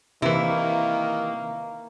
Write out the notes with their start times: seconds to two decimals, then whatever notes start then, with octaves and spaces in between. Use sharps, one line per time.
0.22 C3 D#3 E3 A#3 E4